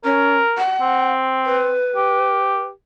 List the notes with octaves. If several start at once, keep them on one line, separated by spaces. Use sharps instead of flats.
C#4 A#4
F#5
C4
B4
G4